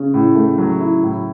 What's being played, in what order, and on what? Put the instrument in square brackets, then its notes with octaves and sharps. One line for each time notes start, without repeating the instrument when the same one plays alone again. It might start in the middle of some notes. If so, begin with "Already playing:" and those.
Already playing: [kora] C#3
[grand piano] A2
A3
F#3
E4
A2